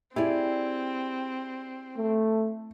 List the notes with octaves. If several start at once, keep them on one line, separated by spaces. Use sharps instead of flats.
C4 E4 G4 G#4 D5
A3